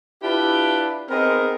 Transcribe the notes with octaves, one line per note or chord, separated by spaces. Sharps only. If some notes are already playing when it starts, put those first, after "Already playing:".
D4 E4 F4 G4 B4
B3 C4 D#4 G#4 A#4